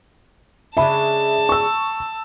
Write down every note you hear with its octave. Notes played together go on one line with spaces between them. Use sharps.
C#3 G#3 D4 E5 A5 B5
C#6 E6